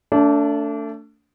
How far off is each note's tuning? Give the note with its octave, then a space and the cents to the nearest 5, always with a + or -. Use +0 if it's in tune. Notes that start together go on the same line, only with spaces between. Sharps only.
A3 +25 D4 -25